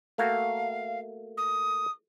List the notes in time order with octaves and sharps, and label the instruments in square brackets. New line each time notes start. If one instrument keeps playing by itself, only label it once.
[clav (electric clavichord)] A3 A#3 F#4 [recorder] F5
[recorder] D#6